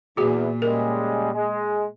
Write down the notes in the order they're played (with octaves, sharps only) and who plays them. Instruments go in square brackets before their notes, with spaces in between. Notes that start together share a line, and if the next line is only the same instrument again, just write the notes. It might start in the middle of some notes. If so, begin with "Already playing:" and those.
[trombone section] E2 [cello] A#2 [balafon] F#4 G#4
[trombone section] C#3 G3 G#3 [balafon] A#4
[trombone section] G#3